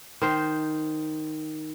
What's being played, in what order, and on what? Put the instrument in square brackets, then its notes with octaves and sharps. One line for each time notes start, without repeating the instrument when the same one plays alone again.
[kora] D#3 C5